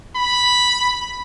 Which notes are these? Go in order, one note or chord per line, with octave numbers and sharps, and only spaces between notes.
B5